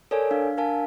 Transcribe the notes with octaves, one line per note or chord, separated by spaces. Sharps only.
A4 A#4 C#5 D5 G#5
D4 F5
D4 A#4 F5 G#5 A5